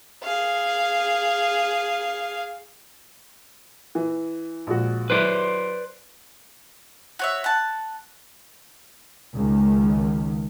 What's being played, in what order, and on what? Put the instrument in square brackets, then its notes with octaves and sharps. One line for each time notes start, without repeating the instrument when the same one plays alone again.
[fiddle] G#4 F5
[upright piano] E3
A#1 G#3 F#4
[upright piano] F#3 E4 [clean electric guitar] B4 C5 D5
[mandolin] F#4 C#5 E5
F#5 A5
[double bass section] C#2 D#3